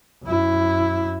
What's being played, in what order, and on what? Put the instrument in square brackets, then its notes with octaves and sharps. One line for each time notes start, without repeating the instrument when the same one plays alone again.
[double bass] F#2 E4